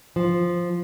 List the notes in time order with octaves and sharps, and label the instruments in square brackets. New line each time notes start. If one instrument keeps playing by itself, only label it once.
[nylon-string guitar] F3